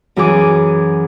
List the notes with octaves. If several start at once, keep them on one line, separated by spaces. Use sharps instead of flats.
F#2 E3 F#4 G#4 G#5 D6